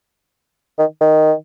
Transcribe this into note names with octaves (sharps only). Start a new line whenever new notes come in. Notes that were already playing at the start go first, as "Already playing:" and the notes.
D#3
D#3